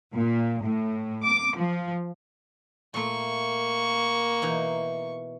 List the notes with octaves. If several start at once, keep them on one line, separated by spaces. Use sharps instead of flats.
A#2
A2
D6
F3
A#2 A3 A#3 C#6
B2 E3 D#4